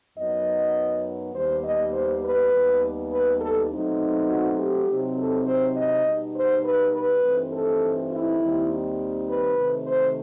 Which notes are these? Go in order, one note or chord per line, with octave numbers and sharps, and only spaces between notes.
F#2 F#3 B3 D#4 D#5
D#2 D#3 G3 B3 D#4 C5
D#5
C5
B4
D#2 D#3 G3 B3
B4
A4
B2 F#3 A3 C4 D#4
F#4
G4
C3 F#3 C4 D#4
A4
C5
D#5
B2 G3 D#4
C5
B4
B4
G2 E3 A3 C4 D#4
A4
E4
D#2 D#3 G3 C4 D#4
B4
C3 D#3 A3 C4
C5